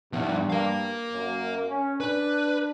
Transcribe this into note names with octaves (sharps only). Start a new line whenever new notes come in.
G2 F3 B3
A#4 F5
F#2
C#4
D4 B4